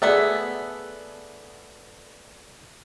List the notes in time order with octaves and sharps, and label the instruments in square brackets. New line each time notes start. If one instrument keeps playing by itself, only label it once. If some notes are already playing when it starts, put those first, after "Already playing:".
[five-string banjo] A3 B3 A4 [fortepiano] G#4 D5